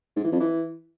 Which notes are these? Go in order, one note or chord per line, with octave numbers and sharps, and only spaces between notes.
G#2
E3
F2
E3